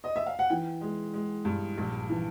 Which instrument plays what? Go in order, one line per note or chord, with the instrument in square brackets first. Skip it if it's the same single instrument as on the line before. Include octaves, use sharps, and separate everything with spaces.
[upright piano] D#5
E5
F5
F#5
E3 G5
G#3
G#3
G2
A#1
E3